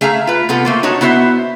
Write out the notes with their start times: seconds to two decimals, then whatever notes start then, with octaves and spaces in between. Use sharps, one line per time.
0.01 A3 G#4 E5 F5 A#5
0.27 F4 B4
0.49 C3 B3 F4 A4
0.65 A3 A#3 C5
0.83 D#4 F#4 C#5 A5
1.01 B3 E4 F#4 C5 E5